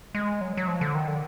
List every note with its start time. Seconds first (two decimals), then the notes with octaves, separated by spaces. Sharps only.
0.15 G#3
0.41 F#3
0.57 F#3
0.68 F3
0.81 D3
0.95 D#3
1.07 D3